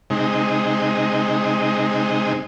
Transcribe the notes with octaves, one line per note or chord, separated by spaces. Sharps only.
C3 G#3 D#4